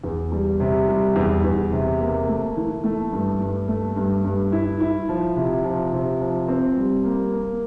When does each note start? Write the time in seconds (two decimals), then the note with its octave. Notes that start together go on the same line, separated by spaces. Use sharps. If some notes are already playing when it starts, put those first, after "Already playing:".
0.04 E2
0.32 G3
0.60 C3
0.88 G3
1.16 E2
1.44 E2
1.72 C3
2.00 A#3
2.28 A3
2.57 E3
2.84 A3
3.12 G2
3.40 G2
3.68 A3
3.96 G2
4.24 G2
4.52 E4
4.80 E4
5.09 F3
5.36 C3
5.64 F3
5.93 C3
6.21 F3
6.48 C4
6.77 G3
7.04 A#3
7.33 A#3